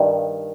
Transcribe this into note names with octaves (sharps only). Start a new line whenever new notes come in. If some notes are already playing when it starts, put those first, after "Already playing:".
Already playing: G2 D#3